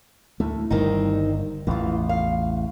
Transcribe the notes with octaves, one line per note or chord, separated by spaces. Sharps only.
D2 A2 A3
G1 G2 D#3 G3 C4 D#4
A1 E2 E3 F4
F5